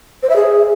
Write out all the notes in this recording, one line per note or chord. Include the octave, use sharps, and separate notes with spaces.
C5
E5
G#4